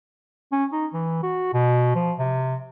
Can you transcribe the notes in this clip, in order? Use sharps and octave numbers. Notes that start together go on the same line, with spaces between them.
C#4
D#4
E3
F#4
B2
F3
C3